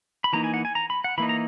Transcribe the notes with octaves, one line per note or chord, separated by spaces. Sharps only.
B5
E3 A#3 D#4 A#5
G#5
F#5
G#5
A#5
B5
F#5
E3 A#3 D#4 B5
A#5